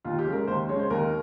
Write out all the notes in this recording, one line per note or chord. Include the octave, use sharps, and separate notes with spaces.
D#2 F4
G4
C#3 G#3
A#4
D#2 C5
C#3 G#3 C#5
C5
D#2 A#4